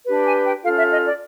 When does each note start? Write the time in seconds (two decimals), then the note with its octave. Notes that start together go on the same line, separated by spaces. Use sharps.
0.07 D4 G4 B4
0.26 G#5
0.45 G5
0.63 C#4 F4 A4 F5
0.78 E5
0.92 D#5
1.06 D5